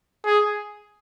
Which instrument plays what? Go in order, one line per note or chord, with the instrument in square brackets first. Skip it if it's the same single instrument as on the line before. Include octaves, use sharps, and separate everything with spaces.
[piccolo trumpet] G#4